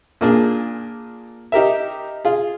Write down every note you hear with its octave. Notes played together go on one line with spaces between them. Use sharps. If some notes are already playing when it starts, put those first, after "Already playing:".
A#2 A#3 D4 G#4
D#4 G4 A#4 E5
F4 G#4